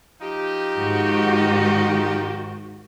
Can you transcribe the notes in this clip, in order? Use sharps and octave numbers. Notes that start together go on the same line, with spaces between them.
F3 D#4 G4
G#2 D#3 F#4